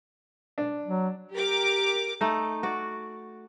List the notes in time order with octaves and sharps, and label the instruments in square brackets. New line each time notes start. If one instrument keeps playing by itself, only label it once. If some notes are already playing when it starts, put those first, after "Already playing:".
[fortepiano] D4
[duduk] F#3
[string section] G4 A#4 D6
[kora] A3 D#4
F#4 D5